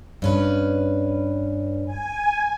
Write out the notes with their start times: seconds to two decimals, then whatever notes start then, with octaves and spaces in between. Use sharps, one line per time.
0.22 G2 C#4 B4
1.85 G#5